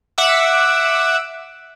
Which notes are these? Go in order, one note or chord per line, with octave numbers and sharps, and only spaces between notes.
E5 F#5 D6 E6